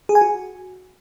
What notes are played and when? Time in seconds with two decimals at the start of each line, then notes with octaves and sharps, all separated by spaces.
0.09 G#4
0.15 G#5
0.21 F#4